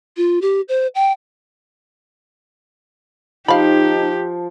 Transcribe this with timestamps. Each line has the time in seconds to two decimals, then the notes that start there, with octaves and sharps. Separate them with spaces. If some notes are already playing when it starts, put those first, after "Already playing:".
0.17 F4
0.42 G4
0.68 C5
0.95 G5
3.48 F3 D#4 G4 F5 B5